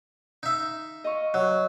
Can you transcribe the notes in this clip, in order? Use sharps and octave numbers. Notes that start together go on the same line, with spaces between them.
D#4 E5
D#5 F5 C#6
F#3